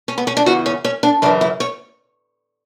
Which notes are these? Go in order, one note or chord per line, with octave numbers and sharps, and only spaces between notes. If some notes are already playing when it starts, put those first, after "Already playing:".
C#4
B3
C#4
D4
E2 C#3 E3 F#4
C#4
C#4
D4
F#2 C#3 E3 D4
E4
C#5